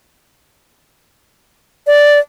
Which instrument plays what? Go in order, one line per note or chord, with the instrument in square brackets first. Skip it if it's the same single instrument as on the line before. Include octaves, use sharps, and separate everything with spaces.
[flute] D5